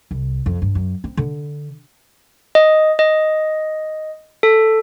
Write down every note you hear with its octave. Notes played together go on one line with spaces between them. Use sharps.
C2
F2
G2
F#2
C4
D3
D#5
D#5
A4